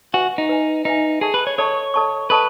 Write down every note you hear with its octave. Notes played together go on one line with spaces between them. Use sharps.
F#4 B4 E5 G#5
D#4
B4 E5 G#5
D#4 B4 E5 G#5
G#4 A4 D#5 A5 C#6
B4
C#5
A4 C#5 D#5 A5 C#6
A4 D#5 A5 C#6
A4 B4 D#5 A5 C#6